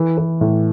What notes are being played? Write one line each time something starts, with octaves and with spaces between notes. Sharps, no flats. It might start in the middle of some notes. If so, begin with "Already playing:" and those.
Already playing: E3
E3
A2